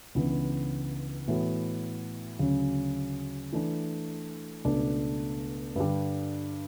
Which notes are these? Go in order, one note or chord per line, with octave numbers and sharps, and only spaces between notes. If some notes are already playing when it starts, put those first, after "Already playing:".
C#2 C#3 E3 B3 D4
A2 E3 B3 F#4 A4
D2 C#3 F#3 C#4
E3 A3 D4
C#2 B2 A3 D4
G2 D3 G3 D4 G4